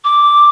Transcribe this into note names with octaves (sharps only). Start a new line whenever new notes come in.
D6